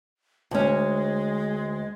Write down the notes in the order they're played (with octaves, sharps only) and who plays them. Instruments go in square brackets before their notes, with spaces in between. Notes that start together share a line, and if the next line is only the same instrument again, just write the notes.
[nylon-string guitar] D2 C#4 [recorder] G#3